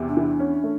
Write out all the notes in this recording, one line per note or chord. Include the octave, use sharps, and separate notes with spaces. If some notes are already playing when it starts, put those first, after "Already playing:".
Already playing: E2 C3
D4
E3
C#4
A3